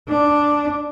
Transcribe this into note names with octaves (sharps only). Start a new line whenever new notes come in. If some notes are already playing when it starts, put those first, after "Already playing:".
D4